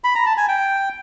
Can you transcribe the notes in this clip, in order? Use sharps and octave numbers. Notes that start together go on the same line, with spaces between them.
B5
A#5
A5
G#5
G5